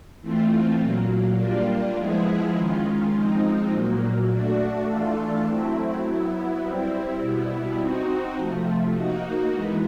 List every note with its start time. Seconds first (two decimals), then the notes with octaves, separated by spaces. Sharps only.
0.21 E3 A3 C4 F4
0.78 A#2 F#3 A#3
1.37 G3 A#3 D4 F4
1.95 F3 G#3 B3 E4 G#4
2.53 D#3 G#3 C#4 F4
3.12 F3 G#3 C4 D#4
3.69 A#2 F#3 A#3
4.28 A3 D4 F#4
4.86 E3 A3 D4 F4 A4
5.44 F#3 A3 C4 E4
6.02 F#3 B3 E4
6.60 G3 C4 E4
7.19 B2 G3 B3 E4
7.77 C4 D#4 F#4
8.35 C3 F3 A3
8.93 A#3 D#4 F#4
9.51 E3 G#3 B3